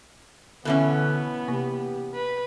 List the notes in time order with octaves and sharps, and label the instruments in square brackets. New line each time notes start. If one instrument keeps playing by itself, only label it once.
[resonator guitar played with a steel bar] B2 E3 C#4 [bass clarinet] D3 [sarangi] B3
[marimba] C3 A#3 [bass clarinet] G4
[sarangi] B4